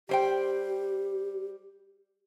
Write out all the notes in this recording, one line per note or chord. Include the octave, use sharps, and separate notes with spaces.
G3 G4 C5 G5